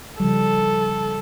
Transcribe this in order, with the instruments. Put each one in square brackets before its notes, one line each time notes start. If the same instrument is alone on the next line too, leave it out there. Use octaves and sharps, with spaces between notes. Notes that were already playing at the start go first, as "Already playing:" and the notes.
[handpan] C#3 F3 G3 [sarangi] A4